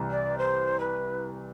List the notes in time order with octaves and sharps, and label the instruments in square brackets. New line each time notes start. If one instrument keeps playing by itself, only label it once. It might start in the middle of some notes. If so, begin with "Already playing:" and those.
Already playing: [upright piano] C2 C3 E3
[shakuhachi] D5
C5
B4